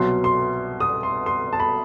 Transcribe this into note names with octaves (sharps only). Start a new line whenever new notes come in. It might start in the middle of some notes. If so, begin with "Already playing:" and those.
Already playing: C2 B2 F#3 C6
C6
D#6
C6
C6
A5
B5